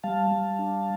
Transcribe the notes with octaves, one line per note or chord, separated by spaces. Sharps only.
G3 F5 A5
G3
D4